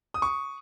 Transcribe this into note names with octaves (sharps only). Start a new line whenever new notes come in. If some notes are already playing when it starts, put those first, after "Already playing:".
D#6
C#6